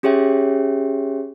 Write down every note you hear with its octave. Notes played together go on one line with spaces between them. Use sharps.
C#4 G4 G#4 C#5 E5 G5